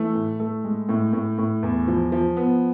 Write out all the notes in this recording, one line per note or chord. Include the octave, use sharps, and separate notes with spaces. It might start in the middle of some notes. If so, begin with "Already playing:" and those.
Already playing: E3 A3
A2
A3
G#3
A2
A2
A2
E2
F3
F3
B3